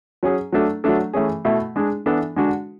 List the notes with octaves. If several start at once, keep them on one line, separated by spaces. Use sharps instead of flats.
F#3 C#4 G#4
F#3 A3 D4 A4
F#3 A3 D4 A4
E3 A3 C#4 G#4
B2 A3 E4
G#3 D4 G#4
E3 B3 D4 A4
D3 G#3 D4 F#4